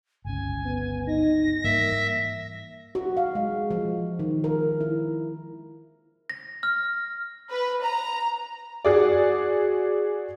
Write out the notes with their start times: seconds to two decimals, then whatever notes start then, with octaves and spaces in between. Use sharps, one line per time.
0.25 G1 C#2 C#4 G#5
0.65 B3
1.07 D#4 A#6
1.64 G#2 E3 G3 A#3 E5
2.95 F#4
3.17 F5
3.35 G#3
3.71 F3
4.19 D#3
4.44 A#4
4.81 E4
6.30 A#6
6.63 F6
7.50 B4
7.83 A#5
8.85 F#4 G#4 D5